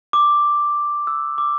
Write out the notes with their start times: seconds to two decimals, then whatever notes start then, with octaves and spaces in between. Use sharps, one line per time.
0.13 D6
1.07 E6
1.38 D6